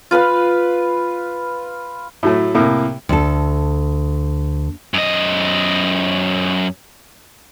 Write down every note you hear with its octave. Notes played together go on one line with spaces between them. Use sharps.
F4 B4 F5 B5
A2 F#3 A3
C2 A2 A#3
D2 A4
F#2 D#5